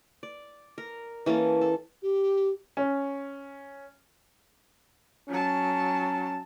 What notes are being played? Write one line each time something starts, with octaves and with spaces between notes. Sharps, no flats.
D5
A#4
E3 A#3 C#4 A4
A4
G4
C#4
F#3 C#4 A5